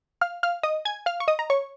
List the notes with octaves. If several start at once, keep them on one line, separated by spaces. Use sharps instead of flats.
F5 F6
F5 F6
D#5 D#6
G#5 G#6
F5 F6
C#6
D#5 D#6
A#5
C#5 C#6